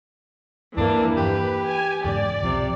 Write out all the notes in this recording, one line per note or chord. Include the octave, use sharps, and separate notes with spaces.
E2 G2 E3 F3 A#3 D4
E3 G4 B4
G#5
E2 G#2 C#3 D5
B1 C3 F3